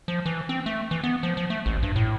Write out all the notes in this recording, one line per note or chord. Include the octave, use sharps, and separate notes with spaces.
F3
E3
C4
A3
E3
B3
F3
F3
A3
A1
G2
A2